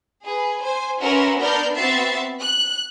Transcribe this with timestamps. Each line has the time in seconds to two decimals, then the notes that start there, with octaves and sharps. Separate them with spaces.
0.22 G#4 B4
0.62 C5 G#5
1.01 C#4 F#4 A#4 B4 E5 C6
1.40 B3 D4 A#4 D5 F6 G6
1.75 B3 C4 F#4 E5 A6 C7
2.41 F#6